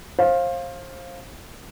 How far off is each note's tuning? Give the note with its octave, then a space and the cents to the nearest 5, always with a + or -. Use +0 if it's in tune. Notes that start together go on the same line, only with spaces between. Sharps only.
C5 +30 F5 +0